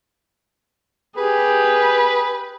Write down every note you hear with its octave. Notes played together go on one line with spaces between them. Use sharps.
G4 G#4 B4